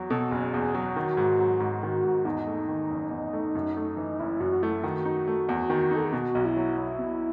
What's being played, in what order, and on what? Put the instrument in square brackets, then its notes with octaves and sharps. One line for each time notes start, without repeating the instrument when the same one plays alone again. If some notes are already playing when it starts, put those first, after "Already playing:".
Already playing: [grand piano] E2 F#3
[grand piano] B2 [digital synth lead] A4
[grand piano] F#1 [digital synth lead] G#4
[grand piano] E2 [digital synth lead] G#4
[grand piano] F#3 [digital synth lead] F#4
[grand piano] D#3
G#2
F#3
G#2
D#3
G#2
[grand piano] E2 [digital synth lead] D#4
[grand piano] A3
D#3
F#1
E2
A3
F#2
A3
E3
[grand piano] F#1 [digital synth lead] E4
[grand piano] F#2 [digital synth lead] F#4
[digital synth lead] F#4
[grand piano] A3 [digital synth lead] E4
[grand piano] D#3 [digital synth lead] F#4
[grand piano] D#4
A3
E2
D#3
D#4
[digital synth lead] A4
G#4
[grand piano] B2 [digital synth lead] F#4
[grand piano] B1
[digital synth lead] E4
[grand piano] F#3
B1
B2